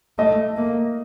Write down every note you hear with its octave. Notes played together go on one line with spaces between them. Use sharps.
A3 D#5
A#3